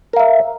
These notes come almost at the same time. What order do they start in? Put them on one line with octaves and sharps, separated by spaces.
A#4 F5 E5